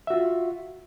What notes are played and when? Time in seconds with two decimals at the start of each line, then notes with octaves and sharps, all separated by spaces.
0.07 E5
0.10 F#4
0.13 F4